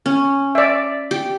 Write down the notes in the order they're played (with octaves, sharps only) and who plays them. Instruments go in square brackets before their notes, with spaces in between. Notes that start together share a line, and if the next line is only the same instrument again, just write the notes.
[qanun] C#4
[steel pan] D5 E5
[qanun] G4